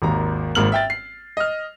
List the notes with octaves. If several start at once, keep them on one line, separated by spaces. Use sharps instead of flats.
G#1 D#2 A#5
G#1 G#2 A#3 F6 F#7
E5 G5 A6
C7
D#5 F6